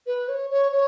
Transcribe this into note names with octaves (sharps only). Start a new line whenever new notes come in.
B4
C#5
C#5
C#5